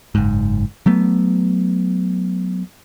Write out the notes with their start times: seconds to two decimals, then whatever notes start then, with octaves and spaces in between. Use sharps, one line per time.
0.15 F#1 G#2
0.86 F#3 A3 B3